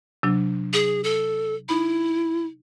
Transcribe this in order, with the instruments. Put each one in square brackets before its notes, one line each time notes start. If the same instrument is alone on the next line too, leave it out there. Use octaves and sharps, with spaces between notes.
[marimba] C3 F#3 D4
[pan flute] G#4
A4
[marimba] D#4 B5 [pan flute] E4